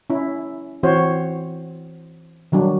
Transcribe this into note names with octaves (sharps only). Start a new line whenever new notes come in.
C#4 E4
E3 C4 F#4 C5 C#5
D#3 F#3 G3 D4